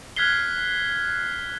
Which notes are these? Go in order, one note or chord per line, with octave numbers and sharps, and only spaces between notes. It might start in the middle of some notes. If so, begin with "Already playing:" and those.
F6 F#6 G#6 B6 C7 G7